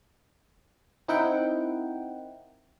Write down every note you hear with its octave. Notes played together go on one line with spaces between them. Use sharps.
C4 D#4 E4 A#4 F#5 G5